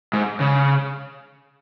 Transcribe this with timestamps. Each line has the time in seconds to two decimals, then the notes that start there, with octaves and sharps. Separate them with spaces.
0.13 G#2
0.40 C#3